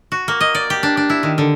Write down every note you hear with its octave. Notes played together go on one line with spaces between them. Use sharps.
F#4
A#3
D#5
D5
G4
D4
D4
E4
D#3
D3